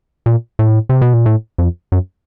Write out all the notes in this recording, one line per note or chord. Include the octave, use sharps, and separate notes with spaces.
A#2
A2
C3
B2
A#2
A2
F2
F#2